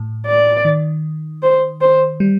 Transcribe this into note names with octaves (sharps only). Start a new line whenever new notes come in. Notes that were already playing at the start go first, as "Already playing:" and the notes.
Already playing: A2
D5
D#3
C5
C5
G3